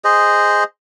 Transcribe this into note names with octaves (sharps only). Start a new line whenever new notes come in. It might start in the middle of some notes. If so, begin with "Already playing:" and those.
G#4 C5 D#5